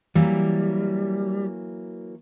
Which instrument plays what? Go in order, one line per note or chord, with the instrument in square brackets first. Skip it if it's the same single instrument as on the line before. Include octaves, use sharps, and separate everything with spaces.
[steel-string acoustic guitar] E3 F#3 A#3 [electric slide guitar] G3